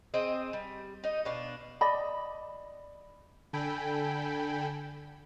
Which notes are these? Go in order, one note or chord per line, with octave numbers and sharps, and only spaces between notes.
C4 G#4 D#5
G3
D#4 D#5
B2 D4 F5
D5 D#5 B5
D3 A4 G5 G#5 B5